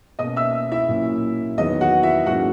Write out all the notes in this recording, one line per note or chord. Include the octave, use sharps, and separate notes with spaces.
B2 A#3 C#4 D#5 D#6
E5 E6
E4 E5
A#2 F#3 A#3 C#4
E2 D#3 F#3 B3 D#5
F#4 F#5
E4 E5
G#2 F#3 A#3 C#4 F#4 F#5